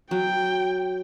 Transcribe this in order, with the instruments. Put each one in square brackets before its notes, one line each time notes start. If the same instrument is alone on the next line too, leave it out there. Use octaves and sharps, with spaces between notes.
[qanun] F#3 [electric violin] G5